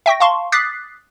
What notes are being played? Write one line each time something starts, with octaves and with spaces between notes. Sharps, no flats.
E5 G5 C#6 A#6
F5 A5 C6 C#6
D6 D#6 F#6 A6 B6 C7